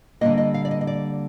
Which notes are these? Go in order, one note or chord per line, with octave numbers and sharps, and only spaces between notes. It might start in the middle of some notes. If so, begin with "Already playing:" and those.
D3 G3 A#3 D#5
D#5
F5
D5
D#5
D#5
D5